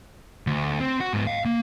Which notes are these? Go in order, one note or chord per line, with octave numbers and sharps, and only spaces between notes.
D2
C4
F#4
G#2 B3
D#5 F5
A#3